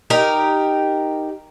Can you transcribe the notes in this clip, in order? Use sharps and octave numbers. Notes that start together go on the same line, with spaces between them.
D#4 G4 A#4